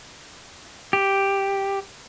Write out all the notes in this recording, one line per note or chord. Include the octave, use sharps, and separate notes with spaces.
G4